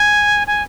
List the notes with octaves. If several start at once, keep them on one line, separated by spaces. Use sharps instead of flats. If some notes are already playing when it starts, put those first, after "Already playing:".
Already playing: G#5
G#5